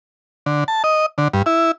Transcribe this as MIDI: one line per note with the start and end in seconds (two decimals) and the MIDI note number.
0.46 0.64 50
0.68 0.83 81
0.84 1.06 75
1.18 1.28 50
1.33 1.42 43
1.46 1.71 64